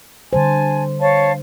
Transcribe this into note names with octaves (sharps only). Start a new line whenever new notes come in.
D3 G3 C5 G#5 A5
C#5 F5 A5